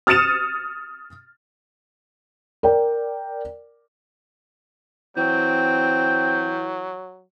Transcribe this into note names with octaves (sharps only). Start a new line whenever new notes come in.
D#6 F6 A6 C#7 D#7 E7
A#4 D5 G5
E3 F#3 C4 G5